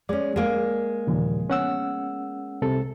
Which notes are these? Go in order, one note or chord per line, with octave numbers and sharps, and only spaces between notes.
G#3 C#4 D5
G#3 A#3
D#2 A#2 C#3 E3 F3
B3 C#4 F#5 E6
C2 C3 A4